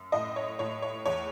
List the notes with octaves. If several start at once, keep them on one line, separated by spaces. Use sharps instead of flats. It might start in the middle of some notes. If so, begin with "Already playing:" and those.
Already playing: F#2
A2 D#5
C#5
A2 C#5
C#5
E2 C#5